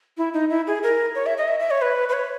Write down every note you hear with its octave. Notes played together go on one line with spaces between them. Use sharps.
E4
D#4
E4
G#4
A#4
C#5
E5
D#5
E5
E5
C#5
B4
B4
C#5